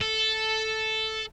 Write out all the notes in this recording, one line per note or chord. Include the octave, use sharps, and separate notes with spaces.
A4